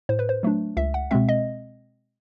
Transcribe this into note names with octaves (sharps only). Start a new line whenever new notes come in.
A2 C5
B4
C5
F#3 A3 D4
C#2 E5
F#5
B2 G#3 C4 E5
D#5